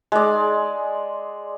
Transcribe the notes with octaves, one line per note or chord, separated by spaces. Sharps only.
G#3 D5